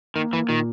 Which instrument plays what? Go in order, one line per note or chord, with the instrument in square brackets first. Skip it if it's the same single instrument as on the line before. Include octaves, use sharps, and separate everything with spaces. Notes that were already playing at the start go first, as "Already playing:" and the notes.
[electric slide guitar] D#3 [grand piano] A#3
[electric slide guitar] E3 [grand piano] A#3
[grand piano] A#2 [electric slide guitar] D#3